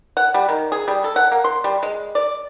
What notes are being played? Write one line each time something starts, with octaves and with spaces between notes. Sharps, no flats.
F#5
G3
D#3
G#4
G3
A4
F#5
A#3
C6
G3
G#3
D5